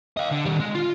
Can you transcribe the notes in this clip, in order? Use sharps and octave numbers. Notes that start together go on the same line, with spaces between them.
D#5 F5
D3
D#3 G3
G#3
F4